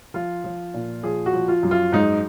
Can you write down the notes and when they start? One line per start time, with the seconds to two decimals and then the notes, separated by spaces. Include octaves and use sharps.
0.14 F3 F4
0.44 F3
0.74 A#2
1.03 F3 G#4
1.26 F#4
1.33 F3
1.48 F4
1.63 F#2
1.71 F4
1.92 G#2 D#4